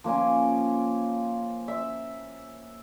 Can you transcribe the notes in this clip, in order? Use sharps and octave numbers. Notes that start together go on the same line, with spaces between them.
F3 A#3 C#4 G#5
E5